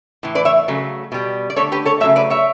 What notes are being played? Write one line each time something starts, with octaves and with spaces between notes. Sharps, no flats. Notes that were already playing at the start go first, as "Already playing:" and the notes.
A2 E3
B4 D5
C#5 E5
C#3 F#3 A3
B2 G3
D5
D3 A3 A4 C#5
G4 B4
A4 C#5
C#3 F#3 A3 C#5 E5
B4 D5
C#5 E5